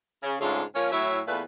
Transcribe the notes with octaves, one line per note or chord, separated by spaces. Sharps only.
C#3
G#2 C#3 A3 D4 F4
F3 A#3 C#4
A2 F#3 E4 C#5 E5
E2 A#2 A3 B4